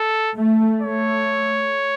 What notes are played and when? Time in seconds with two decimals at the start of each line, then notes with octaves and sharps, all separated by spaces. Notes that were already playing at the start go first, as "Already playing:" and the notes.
Already playing: A4
0.36 A3
0.82 A3 C#5